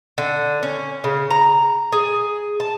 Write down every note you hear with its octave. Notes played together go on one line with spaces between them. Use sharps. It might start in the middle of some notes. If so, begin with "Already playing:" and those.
D3
C#4
C#3
A#5
G#4
A5